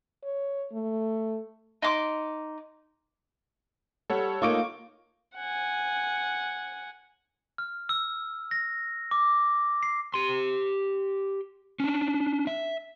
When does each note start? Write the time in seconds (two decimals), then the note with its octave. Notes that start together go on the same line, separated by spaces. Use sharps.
0.24 C#5
0.73 A3
1.82 D#4 C6 D6
4.10 G3 A4 C#5 F#5
4.42 A#3 D#4 F4 C#6 D6 D7
5.36 F#5 G#5
7.58 F6
7.89 E6
8.51 A#6
9.11 D6
9.83 C7
10.14 G4 C6
11.80 C#4 D4
12.47 E5